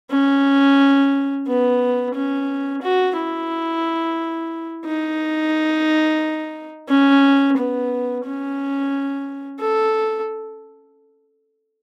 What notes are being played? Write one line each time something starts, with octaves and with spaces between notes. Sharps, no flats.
C#4
B3
C#4
F#4
E4
D#4
C#4
B3
C#4
A4